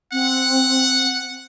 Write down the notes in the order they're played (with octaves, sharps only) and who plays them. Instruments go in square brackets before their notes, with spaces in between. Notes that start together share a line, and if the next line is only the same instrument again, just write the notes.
[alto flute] C4 [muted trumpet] F#5